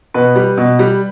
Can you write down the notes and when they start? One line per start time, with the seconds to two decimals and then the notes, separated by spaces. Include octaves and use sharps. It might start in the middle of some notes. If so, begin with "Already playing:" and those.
0.14 B2 B4
0.36 G3
0.57 B2
0.79 G3